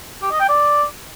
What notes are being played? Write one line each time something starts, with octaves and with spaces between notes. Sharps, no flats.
G4
D#5
G5
D5